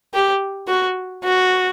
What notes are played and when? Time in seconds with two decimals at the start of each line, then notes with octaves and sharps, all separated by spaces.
0.14 G4
0.68 F#4
1.24 F#4